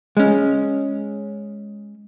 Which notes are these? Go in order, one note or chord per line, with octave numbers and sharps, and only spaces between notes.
G#3 C#4